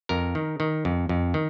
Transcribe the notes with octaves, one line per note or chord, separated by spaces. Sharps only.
F2 A#4
D#3
D#3
F2
F2
D#3